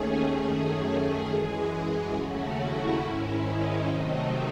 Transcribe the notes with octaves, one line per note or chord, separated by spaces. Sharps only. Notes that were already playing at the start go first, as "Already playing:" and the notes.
Already playing: D#2 D#3 A3 C#4 G#4
F#2 D#3 A3 C#4
F#2 E3 G#3
D#2 C#3 F#3 A3 C#4 F#4
E4
G#2 D#3 G#3 C#4 E4
D#4
C3 D#3 F#3 A3 C4 D#4